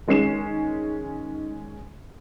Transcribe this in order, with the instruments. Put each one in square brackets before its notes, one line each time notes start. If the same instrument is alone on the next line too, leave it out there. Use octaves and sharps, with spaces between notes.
[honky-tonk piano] D#3 G#3 C#4 C7 E7